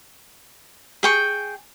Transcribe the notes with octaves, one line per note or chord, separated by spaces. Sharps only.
G#4 G5 C#6